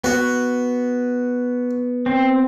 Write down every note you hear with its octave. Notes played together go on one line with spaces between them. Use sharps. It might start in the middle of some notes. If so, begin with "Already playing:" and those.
B3 F#4
C4